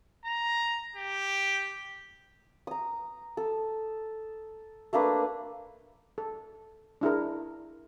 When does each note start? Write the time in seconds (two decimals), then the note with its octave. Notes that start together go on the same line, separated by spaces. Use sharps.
0.25 A#5
0.96 G4
2.67 A#5 D#6
3.37 A4
4.93 A3 A#3 D4 B4
6.18 A4
7.01 D4 E4 G#4 A#4